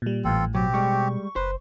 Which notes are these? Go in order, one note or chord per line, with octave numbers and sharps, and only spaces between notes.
A#2 G3
A1 A2 E3 C4 F4 A4
B2 F#3 C4 G4
G3 G#3 C#6
F#1 B4 C5